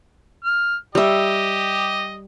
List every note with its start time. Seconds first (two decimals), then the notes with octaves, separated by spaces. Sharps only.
0.44 F6
0.95 G3 G4 D#5 E5